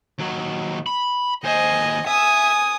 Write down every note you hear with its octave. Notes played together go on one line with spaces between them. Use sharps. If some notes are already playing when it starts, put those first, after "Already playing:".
D#2 F#3
B5
D#2 C5 D#5 G#5
E5 G#5 D#6